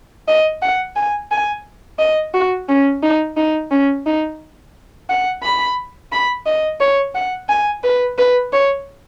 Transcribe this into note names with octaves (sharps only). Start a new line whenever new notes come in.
D#5
F#5
G#5
G#5
D#5
F#4
C#4
D#4
D#4
C#4
D#4
F#5
B5
B5
D#5
C#5
F#5
G#5
B4
B4
C#5